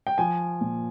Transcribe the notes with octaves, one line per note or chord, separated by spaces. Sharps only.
G5
F3 G#5
A#2